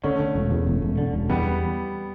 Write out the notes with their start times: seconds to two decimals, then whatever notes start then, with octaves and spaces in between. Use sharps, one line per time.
0.03 D3 A3 C#4
0.20 D3
0.35 E1
0.51 E2
0.67 E1
0.82 E1
0.98 D3
1.14 E1
1.29 E2 G3 B3